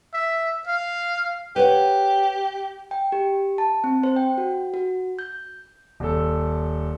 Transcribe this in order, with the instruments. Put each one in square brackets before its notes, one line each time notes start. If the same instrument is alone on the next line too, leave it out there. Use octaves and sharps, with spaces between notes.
[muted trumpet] E5
F5
[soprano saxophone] G4 [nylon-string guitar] B4 C#5 F#5
[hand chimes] G5
G4
A5
C4
C5
G5
F#4
F#4
G6
[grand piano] D#1 A4